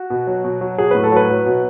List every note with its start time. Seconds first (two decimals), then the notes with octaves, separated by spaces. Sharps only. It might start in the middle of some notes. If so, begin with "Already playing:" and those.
Already playing: F#4
0.10 B2
0.27 F#3
0.44 B2
0.61 F#3
0.78 F#3 G#4
0.91 A2 B4
1.04 A4
1.12 F#3 B4
1.30 F#3
1.46 B2